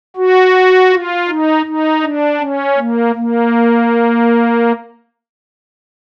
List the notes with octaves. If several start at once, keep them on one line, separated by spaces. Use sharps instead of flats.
F#4
F4
D#4
D#4
D4
C#4
A#3
A#3